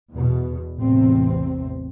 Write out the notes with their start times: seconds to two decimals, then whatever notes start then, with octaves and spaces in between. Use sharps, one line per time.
0.12 E2 B2
0.78 A1 E2 C3 C4